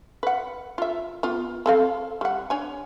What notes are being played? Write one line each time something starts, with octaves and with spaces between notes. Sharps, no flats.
B4 F#5
F4 E5
B3 F4
C4 A4 F5
G3 F#5
D4 C#5 G#5